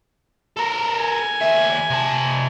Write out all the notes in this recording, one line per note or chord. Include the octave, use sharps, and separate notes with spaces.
A4 A#4
G#5
D#2 E5
C3 A5